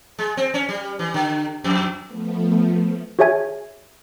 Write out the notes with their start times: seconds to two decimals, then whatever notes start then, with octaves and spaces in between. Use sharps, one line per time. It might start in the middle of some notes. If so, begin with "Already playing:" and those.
0.19 G#3
0.37 C4
0.54 C#4
0.69 G3
0.99 E3
1.14 D3
1.64 F2
2.07 F3 A3 B3
3.19 F#4 G#4 C#5 E5 G#5 G#6